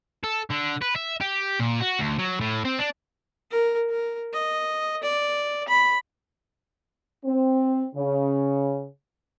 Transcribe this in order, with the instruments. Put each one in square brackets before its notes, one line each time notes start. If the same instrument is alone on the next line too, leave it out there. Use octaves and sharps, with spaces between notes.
[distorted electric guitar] A4
D3
B4
E5
G4
A#2
F#4
D2
F#3
A2
C4
D4
[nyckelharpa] A#4
A#4
D#5
D5
B5
[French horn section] C4
C#3